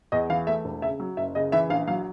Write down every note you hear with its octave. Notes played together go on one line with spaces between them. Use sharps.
E2 D#5
E3 F5
A3 E5
E1
C#3 E5
F#3
F#1 E5
C#3 D#5
E3 E5
A#1 F5
F#3 F5